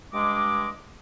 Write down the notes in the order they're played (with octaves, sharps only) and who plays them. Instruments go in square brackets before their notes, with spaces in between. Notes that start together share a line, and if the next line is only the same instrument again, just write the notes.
[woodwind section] G2 G#3 D#5 D6